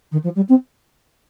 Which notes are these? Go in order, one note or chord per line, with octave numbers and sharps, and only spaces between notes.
D#3
F3
G3
C4